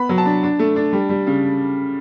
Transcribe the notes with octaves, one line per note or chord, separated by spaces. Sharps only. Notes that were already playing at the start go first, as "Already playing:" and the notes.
Already playing: B3 B5
F#3
A5
D4
D4
A3
D4
G3
G3
C#3